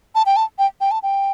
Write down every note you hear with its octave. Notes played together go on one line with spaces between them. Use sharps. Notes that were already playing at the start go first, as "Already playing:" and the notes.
A5
G5
A5
G5
G5
A5
G5